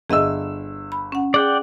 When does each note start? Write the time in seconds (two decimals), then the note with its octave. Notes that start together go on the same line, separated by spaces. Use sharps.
0.10 G1 G#4 D#5 E5 E6
0.92 B5
1.12 C#4 F#5
1.34 G#4 D5 F#5 G5